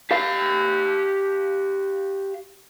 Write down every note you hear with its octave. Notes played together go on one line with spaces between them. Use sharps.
G4 F5